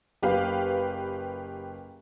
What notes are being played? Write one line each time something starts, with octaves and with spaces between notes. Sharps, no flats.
F#1 G4 B4 F5